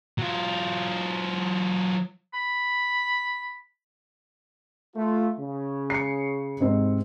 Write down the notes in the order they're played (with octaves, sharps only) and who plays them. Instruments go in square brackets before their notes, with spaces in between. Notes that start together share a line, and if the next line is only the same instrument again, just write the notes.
[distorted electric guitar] F#3 F4
[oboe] B5
[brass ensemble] A3 F4
C#3
[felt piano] C7 C#7
G#2 C3 C4